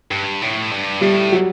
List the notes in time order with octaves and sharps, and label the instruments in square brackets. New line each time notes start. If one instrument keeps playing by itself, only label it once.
[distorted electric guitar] G2
A2
G2
[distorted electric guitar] A2 [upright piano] G3
[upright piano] F#3